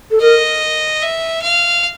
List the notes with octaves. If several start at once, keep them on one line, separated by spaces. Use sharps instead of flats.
A4
A#4 D#5
E5
F5